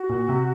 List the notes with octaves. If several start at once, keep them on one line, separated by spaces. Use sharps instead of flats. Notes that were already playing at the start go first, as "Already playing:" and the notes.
Already playing: F#4
A#2
C3